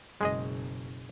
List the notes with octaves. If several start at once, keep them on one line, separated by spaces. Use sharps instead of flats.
F#1 B2 G#3 G#4 D#5